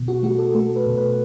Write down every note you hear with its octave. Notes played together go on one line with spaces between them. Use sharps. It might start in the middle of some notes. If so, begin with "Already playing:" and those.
Already playing: B2
F#4
A3 F#4
A4
A3 A4
B4
B2
B4